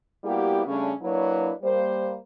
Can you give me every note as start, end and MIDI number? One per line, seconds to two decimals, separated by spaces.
0.24 0.63 55
0.24 0.63 58
0.24 0.63 59
0.24 0.63 64
0.24 0.63 66
0.24 0.63 67
0.67 0.92 49
0.67 0.92 55
0.67 0.92 57
0.67 0.92 61
0.67 0.92 62
1.02 1.51 54
1.02 1.51 58
1.02 1.51 62
1.02 1.51 64
1.02 1.51 71
1.02 1.51 73
1.63 2.16 55
1.63 2.16 58
1.63 2.16 72